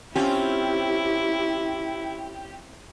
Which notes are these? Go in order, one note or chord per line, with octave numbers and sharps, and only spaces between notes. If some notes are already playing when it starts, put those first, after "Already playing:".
C4 C#4 E4 F4 G4